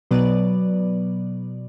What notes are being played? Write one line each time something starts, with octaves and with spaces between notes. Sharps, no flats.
B2 F#3 B3 B4 D5